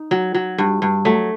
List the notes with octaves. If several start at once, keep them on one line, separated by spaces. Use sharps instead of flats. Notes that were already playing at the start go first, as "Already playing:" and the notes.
Already playing: D#4
F#3
F#3
G2
G2
F#3 A3